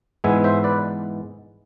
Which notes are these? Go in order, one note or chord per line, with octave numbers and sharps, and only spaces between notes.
G#2 E3 G#3 B3 E5 G#5
C5 E5
B4 D5